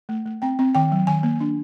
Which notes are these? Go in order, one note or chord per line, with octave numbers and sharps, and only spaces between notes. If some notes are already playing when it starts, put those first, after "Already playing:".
A3
A3
C4 G5
C4
D#3 G5
F#3
D#3 G#5
A#3
D4